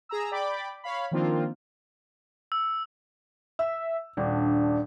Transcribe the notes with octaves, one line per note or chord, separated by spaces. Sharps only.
G#4 A#5 E6
D5 G5 B5 D6
C#5 F5 B5
D#3 F3 A#3 C4 D4 F4
E6
E5 E6
D#1 D4